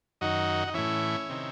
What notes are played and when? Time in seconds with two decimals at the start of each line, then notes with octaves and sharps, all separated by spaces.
0.21 F#2 D#3 D#4 F#4
0.67 D#4
0.74 A2 E3 C#4 E4
1.29 C3 D#3